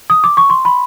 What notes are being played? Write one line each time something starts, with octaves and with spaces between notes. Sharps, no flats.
D#6
D6
C#6
C6
B5